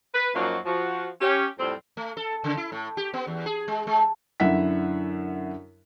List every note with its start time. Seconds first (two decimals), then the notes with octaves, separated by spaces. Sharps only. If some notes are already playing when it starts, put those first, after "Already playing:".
0.14 B4
0.35 F#2 F3 F#3 A#3 D#4 F#4
0.65 F3 F#4
1.21 C#4 G4
1.59 F2 A2 G3 C4
1.97 A3
2.17 A4
2.44 C#3
2.57 E4
2.72 A2
2.97 G4
3.14 B3
3.27 E2
3.46 G#4
3.68 G#3
3.87 G#3
4.40 F#2 D3 E4 E5 F#5 B6